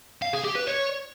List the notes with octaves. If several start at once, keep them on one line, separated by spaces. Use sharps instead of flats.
F5
G#4
G4
B4
C#5